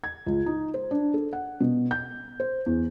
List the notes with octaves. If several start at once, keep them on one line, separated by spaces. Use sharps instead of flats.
G#6
C#2
D#4
C5
D4
A4
F#5
B2
G6
C5
E2